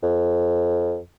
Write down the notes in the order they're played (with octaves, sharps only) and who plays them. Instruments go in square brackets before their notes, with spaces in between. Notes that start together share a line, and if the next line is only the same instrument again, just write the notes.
[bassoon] F2